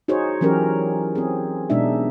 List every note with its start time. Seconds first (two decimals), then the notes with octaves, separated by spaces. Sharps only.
0.08 D#4 F#4 G#4 C5 C#5
0.41 E3 F#3 C#4 G4 A#4
1.15 C4 G#4
1.70 B2 G#3 D4 D#4 E5